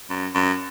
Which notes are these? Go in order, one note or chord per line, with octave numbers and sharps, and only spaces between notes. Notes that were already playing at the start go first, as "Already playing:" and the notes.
F#2
F#2